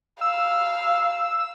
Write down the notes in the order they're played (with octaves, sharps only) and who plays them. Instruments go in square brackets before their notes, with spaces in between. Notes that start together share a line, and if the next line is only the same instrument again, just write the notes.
[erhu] F5 [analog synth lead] E6